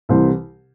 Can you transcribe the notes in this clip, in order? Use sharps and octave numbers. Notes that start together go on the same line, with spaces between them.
C2 C3 E3 C5